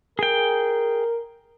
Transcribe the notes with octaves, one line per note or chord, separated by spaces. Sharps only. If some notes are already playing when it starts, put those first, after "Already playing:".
G#4 A#4 G5